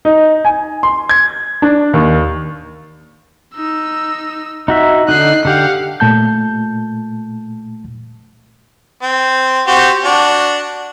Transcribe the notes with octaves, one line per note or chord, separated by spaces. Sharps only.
D#4
G#5
C6
G#6
D4
D#2
D#4 E6
D#4 F#4 E5
D3 D#4 F#6 C7
D3 G4 F5 F#5
A#2 A3 A5 G6
C4
C4 F#4 G4
D4 F#4